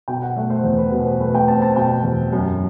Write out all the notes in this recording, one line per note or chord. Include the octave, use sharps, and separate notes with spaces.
B2 G5
F#5
A3 E5
C5
E2
B4
B2 C5
B4
A3 B4
G5
C4 A5
A5
B2 G5
E2
F#2